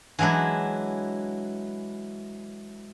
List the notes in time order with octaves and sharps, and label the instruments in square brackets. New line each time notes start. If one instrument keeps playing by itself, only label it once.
[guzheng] E3 F#3 G#3 D4 E4